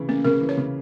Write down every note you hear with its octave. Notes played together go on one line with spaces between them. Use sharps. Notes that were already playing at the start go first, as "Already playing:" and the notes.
Already playing: C#3 E3
A#3 C#4
C#3 A#4
E3
C#5
C#3